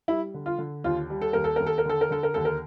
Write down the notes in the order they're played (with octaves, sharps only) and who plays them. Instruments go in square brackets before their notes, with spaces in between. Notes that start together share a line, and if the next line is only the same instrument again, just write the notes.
[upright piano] G3 E4
D3
F4
D3
D#2 F4
G3
A4
D#2 A#4
A4
D#2 A#4
A4
A#4
D3 A4
A#4
D3 A4
A#4
D#2 A4
A#4